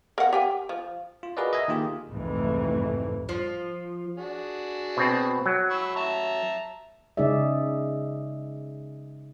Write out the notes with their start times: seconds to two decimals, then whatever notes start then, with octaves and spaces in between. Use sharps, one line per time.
0.18 A#4 F5 F#5
0.33 G4 G5 G#5
0.69 F3
1.23 F4
1.37 F#4 G#4 A#4 B4 D5 D#5
1.53 D#5 E5 G#5
1.68 D#3 A#3 F4 G4 G#4
2.08 C2 F2 G#2 E3 A3
3.29 F3
4.17 D4 F#4 G#4
4.97 B2 C4
5.46 F#3
5.70 B5 C#6 E6
5.96 E5 A5 A#5
7.17 C#3 G#3 D#4 G#4 D5 E5